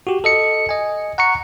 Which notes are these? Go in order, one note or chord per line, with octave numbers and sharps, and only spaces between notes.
F#4 G4
A4 D#5 C#7
D#5 G#5
F#5 A#5 C#6 C#7